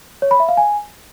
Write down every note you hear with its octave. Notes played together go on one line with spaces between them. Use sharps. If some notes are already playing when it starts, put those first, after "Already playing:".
C#5
B5
E5
F5
G#5